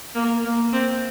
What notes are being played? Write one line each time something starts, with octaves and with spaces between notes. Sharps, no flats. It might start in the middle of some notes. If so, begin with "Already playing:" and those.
A#3
A#3
C4